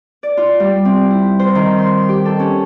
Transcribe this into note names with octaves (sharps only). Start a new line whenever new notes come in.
D5
F4
G3
C4
E4
C5
D#3
C6
G4
A4
C#4